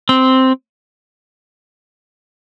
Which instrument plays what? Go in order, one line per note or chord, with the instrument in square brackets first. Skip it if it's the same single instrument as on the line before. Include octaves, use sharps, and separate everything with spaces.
[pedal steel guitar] C4